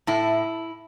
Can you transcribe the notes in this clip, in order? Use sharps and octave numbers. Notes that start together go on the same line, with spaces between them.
A2 E4